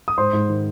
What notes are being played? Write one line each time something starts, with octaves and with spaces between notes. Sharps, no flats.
D#6
G#2 C5 C6
G#2
D#3